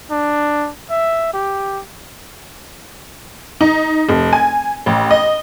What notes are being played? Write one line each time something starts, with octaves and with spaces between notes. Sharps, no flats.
D4
E5
G4
D#4
F1
G#5
A1
D#5